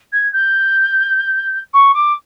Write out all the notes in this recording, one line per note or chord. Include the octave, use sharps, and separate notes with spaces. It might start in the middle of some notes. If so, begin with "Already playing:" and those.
G#6
G6
C#6
D6